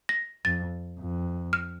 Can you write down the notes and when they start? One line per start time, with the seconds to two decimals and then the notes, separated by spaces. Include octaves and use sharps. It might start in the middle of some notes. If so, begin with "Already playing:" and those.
0.09 A#6
0.45 F2 A6
0.99 F2
1.53 F6